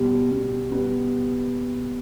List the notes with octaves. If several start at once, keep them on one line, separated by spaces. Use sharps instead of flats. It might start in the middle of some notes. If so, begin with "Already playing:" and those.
Already playing: B2 G3 B3
B2
G3 B3